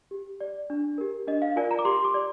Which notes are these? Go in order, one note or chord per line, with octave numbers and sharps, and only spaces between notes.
G4
D5
D4
G4 A#4
D4 D#5
F5
F4 A#4 D5 G#5
A#5
D6
G4 C6
D6
D5